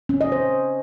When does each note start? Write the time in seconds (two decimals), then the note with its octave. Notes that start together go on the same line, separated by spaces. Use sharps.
0.09 C#4
0.21 D#5
0.32 C5